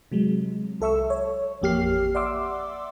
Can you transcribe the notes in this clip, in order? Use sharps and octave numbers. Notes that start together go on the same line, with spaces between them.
C3 F#3 G#3
C2 A4 E5 C#6 E6
C#5
A1 F2 A#3 G4 F6 C7
D5 E5 F#5 C6 D6 E6